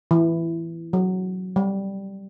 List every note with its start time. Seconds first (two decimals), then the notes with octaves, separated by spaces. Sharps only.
0.11 E3
0.93 F#3
1.56 G3